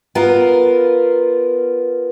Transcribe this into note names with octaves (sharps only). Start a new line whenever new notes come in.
B3 F4 A#4